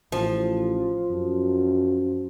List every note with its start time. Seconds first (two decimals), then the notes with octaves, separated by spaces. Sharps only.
0.12 A1 F3
1.11 F#2